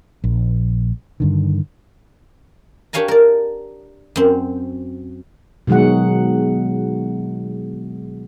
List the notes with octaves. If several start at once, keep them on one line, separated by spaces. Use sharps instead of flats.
A#1
G2 D3 D#3
D4 G4 C#5 F5 G#5 A#5
A#4 D5
F#2 C4
B2 D#3 F#3 G#3 F#5